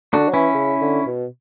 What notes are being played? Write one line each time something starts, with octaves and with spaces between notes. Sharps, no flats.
D3 D4 F#4
F#3
E3 C#4 E4
C#3
D3
B2